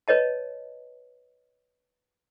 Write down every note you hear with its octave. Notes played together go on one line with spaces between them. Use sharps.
B4 C#5 D#5 A5